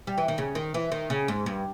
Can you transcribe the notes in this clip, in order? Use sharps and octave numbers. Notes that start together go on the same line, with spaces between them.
G3
E3
D#3
C#3
D#3
E3
D#3
C#3
G#2
G2